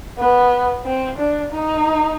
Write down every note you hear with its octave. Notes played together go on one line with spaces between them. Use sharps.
B3
C4
D4
D#4